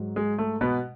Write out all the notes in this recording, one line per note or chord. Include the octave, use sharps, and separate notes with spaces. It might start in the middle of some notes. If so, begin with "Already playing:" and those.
Already playing: G#2 F#3
G#3
A3
B2 B3